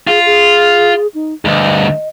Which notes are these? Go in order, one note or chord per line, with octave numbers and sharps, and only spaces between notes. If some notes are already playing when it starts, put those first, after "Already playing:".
F4 G#4
G#4
D#4
D2 G2 D#5